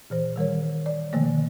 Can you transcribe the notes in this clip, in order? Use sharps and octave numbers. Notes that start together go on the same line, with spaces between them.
A#2 E3 C5
D#3 G3 A#4 C#5
D5
B2 D3 D#3 F3 A3 A#3